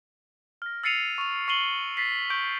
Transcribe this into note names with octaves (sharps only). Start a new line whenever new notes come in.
F6 A#6
E6 A6 C7 C#7 D#7 F7
C#6 F7
C#6 A6 C7 D#7 F#7 G7
A6 B6 C7
C#6 G6 D7